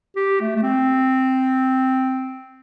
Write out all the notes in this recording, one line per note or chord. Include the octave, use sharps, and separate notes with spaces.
G4
A3
A3
C4